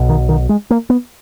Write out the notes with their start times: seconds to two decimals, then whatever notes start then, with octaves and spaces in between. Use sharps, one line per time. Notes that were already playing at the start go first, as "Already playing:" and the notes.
Already playing: B1 B2
0.09 D#3
0.29 D#3
0.49 G#3
0.70 A#3
0.90 B3